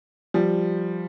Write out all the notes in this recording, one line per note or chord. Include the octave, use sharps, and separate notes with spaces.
F3 G3